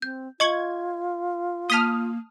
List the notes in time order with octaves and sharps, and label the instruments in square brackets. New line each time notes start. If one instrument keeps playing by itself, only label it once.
[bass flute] C4 [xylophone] G6
[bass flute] F4 [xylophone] D#5 C#6 C#7 [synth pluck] G#6
[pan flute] A#3 [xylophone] A5 B6 G7 [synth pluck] D#6 F6